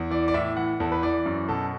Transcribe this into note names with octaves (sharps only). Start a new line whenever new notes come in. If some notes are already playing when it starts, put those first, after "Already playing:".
Already playing: E2
E3 D5
D5
A2 E5
E3 F#5
E2 A4
B4
E3 D5
F#2
B2 A4